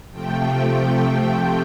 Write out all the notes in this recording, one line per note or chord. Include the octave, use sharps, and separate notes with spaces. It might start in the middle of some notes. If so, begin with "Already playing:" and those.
C3 F3 A3 G5